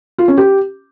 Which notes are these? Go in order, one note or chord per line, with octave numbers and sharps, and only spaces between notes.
F4
C#4
G4